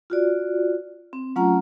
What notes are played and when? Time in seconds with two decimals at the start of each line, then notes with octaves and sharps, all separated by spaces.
0.10 F4 F#4 D5
1.13 C4
1.36 F#3 A3 C#4 F4 F#5 A#5